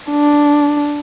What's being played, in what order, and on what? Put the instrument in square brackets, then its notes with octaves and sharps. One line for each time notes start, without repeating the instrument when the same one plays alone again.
[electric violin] D4